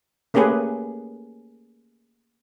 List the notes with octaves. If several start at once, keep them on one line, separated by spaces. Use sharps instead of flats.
A3 A#3 C#4 G4 G#4 B4